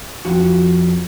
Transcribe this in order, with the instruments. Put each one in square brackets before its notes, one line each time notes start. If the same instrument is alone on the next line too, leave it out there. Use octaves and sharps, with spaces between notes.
[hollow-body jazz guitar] F2 F#4